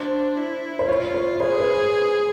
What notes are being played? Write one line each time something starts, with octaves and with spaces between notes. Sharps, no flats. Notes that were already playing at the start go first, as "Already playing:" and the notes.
Already playing: D4 C5
E4
C5
F4 C#5
C5
G#4 C5
B4